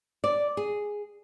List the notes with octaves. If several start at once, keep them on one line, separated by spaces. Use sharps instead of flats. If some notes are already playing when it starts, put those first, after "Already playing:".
D5
G#4